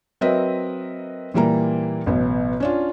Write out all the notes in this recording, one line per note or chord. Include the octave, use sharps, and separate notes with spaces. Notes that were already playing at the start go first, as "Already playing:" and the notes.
F#3 C4 A#4 B4 D#5 E5
A#2 E3 G3 A#3 A#5
A1 B2 F#3
C#4 D4 F4